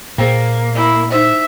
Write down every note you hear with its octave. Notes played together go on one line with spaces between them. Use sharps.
A#2 A#3 G#4 C5 G5
E4
D#4 C5 E5